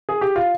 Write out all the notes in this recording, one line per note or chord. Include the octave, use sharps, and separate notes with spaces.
G#4
G4
F4